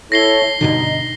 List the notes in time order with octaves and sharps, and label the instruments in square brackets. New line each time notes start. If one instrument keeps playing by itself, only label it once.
[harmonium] E4 A4 C#5 [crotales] A#6 C7 G7
[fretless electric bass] G2 B2 D3 [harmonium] D#4